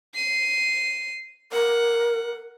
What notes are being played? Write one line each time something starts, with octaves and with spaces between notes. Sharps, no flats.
C7 D#7
A#4 F#5